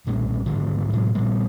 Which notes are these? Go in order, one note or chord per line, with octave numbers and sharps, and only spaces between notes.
B1 G2 A#2
G#1 G#2 D3 F3
A2 C3 F#3 G#3
A#2 F3 G3 A#3